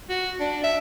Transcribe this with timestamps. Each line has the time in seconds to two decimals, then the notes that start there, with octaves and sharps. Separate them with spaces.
0.10 F#4
0.40 D4
0.64 E5